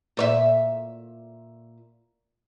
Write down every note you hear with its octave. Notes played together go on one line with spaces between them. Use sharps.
A#2 C#5 E5